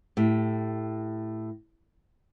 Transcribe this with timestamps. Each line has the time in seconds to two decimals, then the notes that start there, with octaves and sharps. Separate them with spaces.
0.17 A2 G4